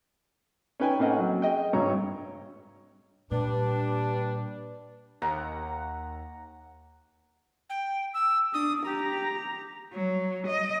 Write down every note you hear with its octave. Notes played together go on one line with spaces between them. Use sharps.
C#4 D#4 B4 G5 G#5
A2 A#3 C4 C#4 D#5 F#5
F#3
G#4 D#5 G5
G#1 G2 C#5 A#5 C#6
A#2 G3 D4 B4
D#2 F#5 A#5
G5
E6
D4 D#6
G4 A#5
F#3
D#5